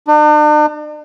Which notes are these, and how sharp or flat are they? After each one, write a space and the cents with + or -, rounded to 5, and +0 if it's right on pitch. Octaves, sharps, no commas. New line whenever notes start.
D4 +45